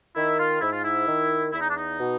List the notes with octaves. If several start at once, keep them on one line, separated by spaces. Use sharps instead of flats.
D#3 E4
F4
G#2 E4
F4
E4
D#3
E2 E4
D#4
D4
D#4
B2